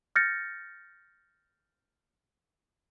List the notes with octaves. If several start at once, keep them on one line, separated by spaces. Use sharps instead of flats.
F6 G6 A6 A#6 C#7